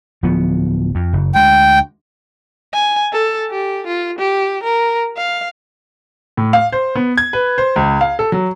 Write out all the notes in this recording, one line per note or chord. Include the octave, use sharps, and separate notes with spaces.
D1 F3 B3
F2
F#1
D2 G#3 G5
G#5
A4
G4
F4
G4
A#4
F5
A2
F5
C5
B3
G#6
B4
C5
C#2
F5
A4
F#3